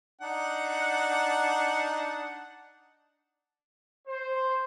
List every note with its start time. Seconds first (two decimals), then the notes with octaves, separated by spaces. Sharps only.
0.21 D4 D#4 F#5
4.07 C5